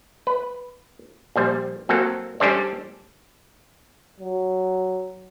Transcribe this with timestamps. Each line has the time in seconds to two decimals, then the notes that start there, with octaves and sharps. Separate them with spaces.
0.27 B4
1.36 A#1 G3 C5
1.89 F#3 A#3 C4 A4
2.40 G3 C#4 D4 A4 C5 D5
4.20 F#3